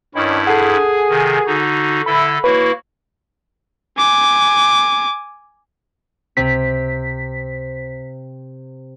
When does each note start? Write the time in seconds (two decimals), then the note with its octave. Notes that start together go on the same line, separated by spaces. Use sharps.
0.15 G2 D#3 C#4 D4 E4
0.47 G#4 A4 F#5
1.09 C3 D#3
1.47 D3 D#4 F#4
2.06 D3 E4 A4 B5
2.44 A#3 E4 F#4 B4 C#5
3.98 G#5 D6
6.37 C#2 C3 B6